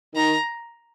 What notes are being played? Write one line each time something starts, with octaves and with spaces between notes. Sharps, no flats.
D#3 A#5